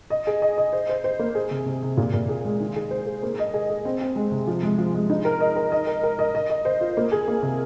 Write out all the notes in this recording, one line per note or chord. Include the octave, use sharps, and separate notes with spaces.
D#5
G#4
D#5
D#5
C5
C5
C5
A#3
G#4
C3
C3
C3
A#2
A#2
G#4
G#3
D#3
G#4
C5
G#4
A#3
D#5
G#4
G#4
C4
C4
G#3
C3
F3
G#3
F3
G#3
D#4
A#4
D#5
A#4
D#5
A#4
A#4
D#5
D#5
D#5
C5
F4
A#3
G#4
A#3
C3